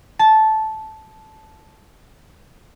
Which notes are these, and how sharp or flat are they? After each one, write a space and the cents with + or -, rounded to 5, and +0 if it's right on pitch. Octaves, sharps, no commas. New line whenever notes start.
A5 -10